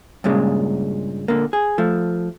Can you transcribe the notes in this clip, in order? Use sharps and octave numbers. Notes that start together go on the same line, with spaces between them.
G2 A#2 C#3 G#3
A#2 D3 A#3
G#4
F3 A3